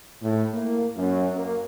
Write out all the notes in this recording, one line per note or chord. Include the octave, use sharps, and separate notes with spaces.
A2
A#3
F#2
A#3